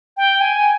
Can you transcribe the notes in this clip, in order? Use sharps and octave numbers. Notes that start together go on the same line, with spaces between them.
G5
G#5